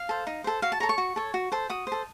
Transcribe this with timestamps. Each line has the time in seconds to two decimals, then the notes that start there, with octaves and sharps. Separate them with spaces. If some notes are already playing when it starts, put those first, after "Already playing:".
Already playing: F5
0.09 A4 C5
0.27 D#4
0.44 A4 C5
0.62 F#4 F5
0.72 A5
0.80 A4 C#5 A#5
0.89 C#6
0.98 F#4
1.16 A4 C#5
1.34 F#4
1.52 A4 C5
1.69 F#4 D#6
1.87 A4 C5